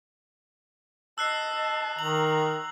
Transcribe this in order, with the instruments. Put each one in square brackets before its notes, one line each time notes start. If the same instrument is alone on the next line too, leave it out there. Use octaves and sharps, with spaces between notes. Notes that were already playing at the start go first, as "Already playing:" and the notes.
[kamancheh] D#5 A5 [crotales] E6 F#6 C7
[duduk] D#3 [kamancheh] A#5 [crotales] F#7